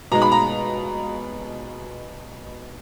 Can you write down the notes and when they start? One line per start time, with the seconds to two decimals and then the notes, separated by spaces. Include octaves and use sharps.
0.12 B2 G#3 D#4 A#5
0.22 B5
0.32 A#5